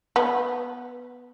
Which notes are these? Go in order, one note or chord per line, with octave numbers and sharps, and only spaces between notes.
B3